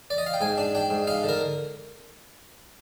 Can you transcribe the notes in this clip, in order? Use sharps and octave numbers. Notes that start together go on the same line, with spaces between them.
D5
D#5
F5
G5
G#2 G#5
D4
D4 G5
G#2
D#4 F5
D3
A#4